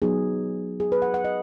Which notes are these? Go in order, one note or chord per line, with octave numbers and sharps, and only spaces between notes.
F#3 B3 D#4 G#4
G#4
B4
F#5
F#5
D#5